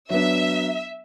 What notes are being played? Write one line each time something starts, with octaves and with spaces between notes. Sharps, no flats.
F#3 B3 D4 E5